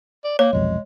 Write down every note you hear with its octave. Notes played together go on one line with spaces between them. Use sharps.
D5
A#3 C#5
F1 B1 F2 G#3